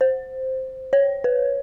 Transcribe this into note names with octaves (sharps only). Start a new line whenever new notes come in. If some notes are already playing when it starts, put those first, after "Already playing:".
C5
C#5
B4